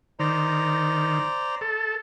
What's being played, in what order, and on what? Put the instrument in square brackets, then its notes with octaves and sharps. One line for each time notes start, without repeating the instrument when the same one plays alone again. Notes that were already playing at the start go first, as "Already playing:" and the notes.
[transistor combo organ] D#3 [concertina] C5 D5 A#5
[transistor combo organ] A4